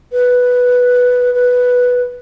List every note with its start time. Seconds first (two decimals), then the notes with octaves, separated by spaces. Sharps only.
0.12 B4
1.34 B4